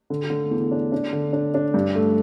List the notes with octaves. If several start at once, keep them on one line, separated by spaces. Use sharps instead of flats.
D3
D3
E2
D4
D4
D3
D4
D4
G2
A3